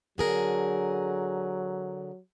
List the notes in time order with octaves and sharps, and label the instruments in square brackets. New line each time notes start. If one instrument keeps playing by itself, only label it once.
[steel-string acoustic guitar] D3 G#4 A#4 [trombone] F#3